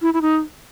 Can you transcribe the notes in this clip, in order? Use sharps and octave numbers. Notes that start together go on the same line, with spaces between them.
E4
E4
D#4